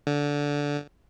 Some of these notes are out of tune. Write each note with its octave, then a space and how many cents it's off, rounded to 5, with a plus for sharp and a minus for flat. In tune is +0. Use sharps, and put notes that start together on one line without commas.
D3 -15